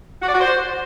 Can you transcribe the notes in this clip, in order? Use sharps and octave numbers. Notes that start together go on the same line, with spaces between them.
F#4
D5
F#4
C5